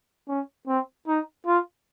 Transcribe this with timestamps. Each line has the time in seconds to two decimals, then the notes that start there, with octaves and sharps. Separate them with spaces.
0.28 C#4
0.67 C4
1.07 D#4
1.46 F4